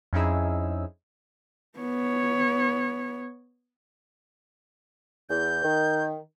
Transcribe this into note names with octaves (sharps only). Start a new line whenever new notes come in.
F2 C#4 D#4 E4 G#4 E6
B3 C#5
E2 G6
D#3